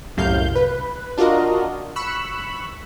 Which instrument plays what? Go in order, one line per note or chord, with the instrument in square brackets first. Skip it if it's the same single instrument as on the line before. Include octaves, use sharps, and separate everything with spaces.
[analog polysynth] C2 F#2 A2 C3 F5 G6
B4
D4 F4 F#4 A#4 D#5
B5 C#6 E6 F#6